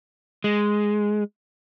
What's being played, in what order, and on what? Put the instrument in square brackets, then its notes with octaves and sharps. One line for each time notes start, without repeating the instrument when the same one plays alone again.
[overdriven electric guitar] G#3